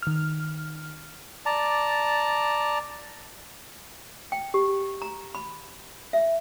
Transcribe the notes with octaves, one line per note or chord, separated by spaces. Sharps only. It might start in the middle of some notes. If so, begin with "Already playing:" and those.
D#3 F6
D5 A5 A#5
G5
G4
A#5
B5
E5